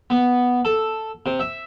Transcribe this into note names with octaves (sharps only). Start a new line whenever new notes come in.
B3
A4
C3
E5